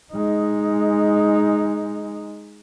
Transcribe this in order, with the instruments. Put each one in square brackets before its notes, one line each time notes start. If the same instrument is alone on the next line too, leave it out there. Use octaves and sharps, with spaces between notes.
[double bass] G#3 D#4